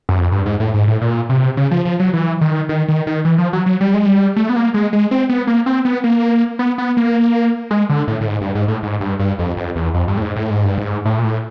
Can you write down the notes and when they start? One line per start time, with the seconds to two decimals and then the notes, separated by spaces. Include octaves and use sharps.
0.09 F#2
0.18 F2
0.32 G2
0.46 G#2
0.60 A2
0.74 G#2
0.87 A2
1.01 A#2
1.29 C3
1.57 C#3
1.71 F3
1.85 F3
2.00 F#3
2.13 E3
2.41 D#3
2.69 D#3
2.88 D#3
3.07 D#3
3.25 E3
3.38 F3
3.53 F#3
3.66 F#3
3.81 G3
3.94 G#3
4.06 G3
4.36 A3
4.49 B3
4.56 A#3
4.74 G#3
4.93 G#3
5.11 C4
5.29 B3
5.47 A#3
5.66 C4
5.85 B3
6.04 A#3
6.59 B3
6.78 B3
6.97 A#3
7.71 G#3
7.89 D3
8.08 A2
8.21 A2
8.27 G#2
8.41 G2
8.55 G#2
8.68 A2
8.83 G#2
9.01 G2
9.19 G2
9.39 F2
9.57 F2
9.76 E2
9.94 F2
10.08 G2
10.17 A2
10.22 G#2
10.36 A2
10.50 G#2
10.64 G2
10.78 G#2
11.05 A2
11.19 A#2
11.24 A2